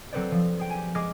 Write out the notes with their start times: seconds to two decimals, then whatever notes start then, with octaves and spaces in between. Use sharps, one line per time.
0.13 F#3 C4 A4 B4 C5 D5
0.32 F3
0.59 G#4 G5
0.70 G4 G#5
0.95 G#3 G#4 D6 F6 A#6